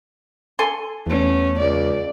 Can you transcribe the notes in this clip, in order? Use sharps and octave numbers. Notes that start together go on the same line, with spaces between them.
A4 G#5 C6
E2 A3 B3 C#4
C#2 D5